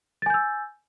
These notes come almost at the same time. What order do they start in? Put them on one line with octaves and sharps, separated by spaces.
A6 G#5 G6 E6